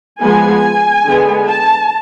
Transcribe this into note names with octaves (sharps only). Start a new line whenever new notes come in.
F3 G#3 B3 G#5
D3 G#3 B3
A5